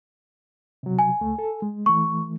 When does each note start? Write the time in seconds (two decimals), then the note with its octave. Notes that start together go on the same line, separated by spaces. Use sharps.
0.83 C3 F#3
0.99 G#5
1.21 C#2 A3
1.39 A4
1.62 G#3
1.86 E3 A3 C#6